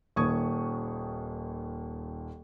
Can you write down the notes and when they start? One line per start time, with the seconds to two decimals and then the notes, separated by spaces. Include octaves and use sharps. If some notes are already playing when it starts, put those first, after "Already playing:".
0.16 D#1 D#2 C#6 D#6 G#6